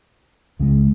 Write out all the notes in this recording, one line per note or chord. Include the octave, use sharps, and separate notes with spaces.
C#2 C#3 G#3